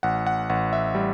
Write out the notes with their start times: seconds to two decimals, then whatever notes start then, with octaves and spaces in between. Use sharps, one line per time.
0.03 A1 F#5
0.27 F#5
0.50 A1 F#5
0.73 E5
0.95 G3